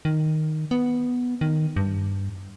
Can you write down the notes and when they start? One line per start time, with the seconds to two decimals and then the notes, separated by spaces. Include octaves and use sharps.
0.05 D#3
0.71 B3
1.41 D#3
1.76 G2